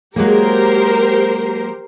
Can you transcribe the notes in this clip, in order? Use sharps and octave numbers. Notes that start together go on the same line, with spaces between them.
F#3 G#3 A#3 G4 A#4 C5